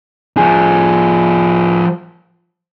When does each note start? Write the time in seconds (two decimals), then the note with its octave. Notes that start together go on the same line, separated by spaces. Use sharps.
0.37 F3 G#4